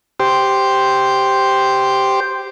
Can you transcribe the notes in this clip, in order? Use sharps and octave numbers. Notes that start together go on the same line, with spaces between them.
G4 C5